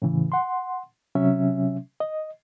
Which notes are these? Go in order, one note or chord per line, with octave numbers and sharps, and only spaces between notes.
A2 C#3 E3
F#5 C6
C3 F#3 C#4 E5
D#5